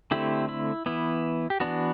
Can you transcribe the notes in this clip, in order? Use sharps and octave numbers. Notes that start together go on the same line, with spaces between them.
D3 A3 C4 E4 G4
E4
E3 B3 E4
G4
E3 B3 D4 F#4